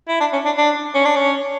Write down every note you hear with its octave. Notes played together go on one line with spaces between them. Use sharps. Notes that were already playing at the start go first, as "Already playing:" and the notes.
E4
D4
C#4
D4
D4
C#4
D4
C#4